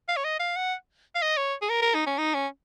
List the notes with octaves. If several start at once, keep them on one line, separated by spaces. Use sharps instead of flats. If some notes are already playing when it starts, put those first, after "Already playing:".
F5
C#5
D#5
F5
F#5
F5
D#5
C#5
G#4
A#4
A#4
D#4
C#4
D#4
C#4